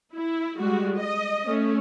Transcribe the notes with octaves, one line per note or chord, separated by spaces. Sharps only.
E4
G3 G#3 F#4
D#5
A3 C#4